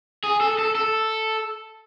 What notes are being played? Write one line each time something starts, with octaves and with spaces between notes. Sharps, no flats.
G#4
A4
A4
A4